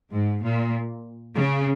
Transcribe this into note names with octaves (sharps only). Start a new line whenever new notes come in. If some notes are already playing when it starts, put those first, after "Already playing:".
G#2
A#2
C#3